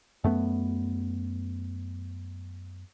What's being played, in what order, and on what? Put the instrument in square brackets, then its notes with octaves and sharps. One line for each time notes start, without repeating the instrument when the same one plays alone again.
[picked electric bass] F#2 A3 B3